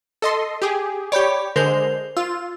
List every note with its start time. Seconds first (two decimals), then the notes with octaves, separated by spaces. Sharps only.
0.22 A4 D#5 C6
0.62 G4 G#4
1.12 G4 C#5 D5 B5 G6
1.56 D3 G#3 A#4 C5 G6
2.17 F4 E6